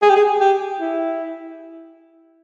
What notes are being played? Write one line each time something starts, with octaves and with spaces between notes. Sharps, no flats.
G#4
G4
G#4
G4
E4